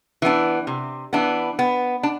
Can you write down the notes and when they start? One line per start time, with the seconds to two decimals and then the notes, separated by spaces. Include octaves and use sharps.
0.22 E3 B3 D4
0.67 C3
1.13 E3 B3 D4
1.59 B3
2.03 D4